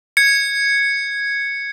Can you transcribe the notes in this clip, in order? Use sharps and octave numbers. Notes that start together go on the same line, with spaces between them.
G#6 C#7